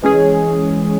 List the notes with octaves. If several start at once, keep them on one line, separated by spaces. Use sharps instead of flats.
E3 G#3 C#4 G#4